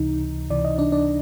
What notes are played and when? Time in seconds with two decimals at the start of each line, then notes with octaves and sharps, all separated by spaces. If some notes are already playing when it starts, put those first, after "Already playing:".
Already playing: C#2 C3 E3 D#4
0.50 C#2 C3 E3 D5
0.65 D#5
0.78 D4 D5
0.92 D4 D5